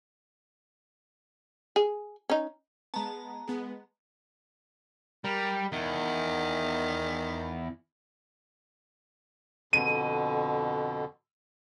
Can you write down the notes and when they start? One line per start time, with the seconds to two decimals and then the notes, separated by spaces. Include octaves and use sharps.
1.76 G#4
2.30 C#4 D#4
2.94 G#3 B3 A5 A#5
3.48 G#3 B3
5.24 G3 A#4
5.72 E2 D#3
9.73 F2 B2 D3 D#7